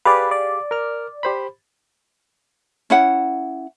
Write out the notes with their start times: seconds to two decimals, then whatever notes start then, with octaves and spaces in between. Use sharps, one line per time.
0.05 G4 G#4 B4 D5 F5
0.31 D5
0.71 A#4 F6
1.23 G4 C5 B5
2.90 C#4 E4 F#5